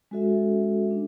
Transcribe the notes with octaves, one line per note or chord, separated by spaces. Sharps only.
G#3 C#4 F#4 A4 E5
D4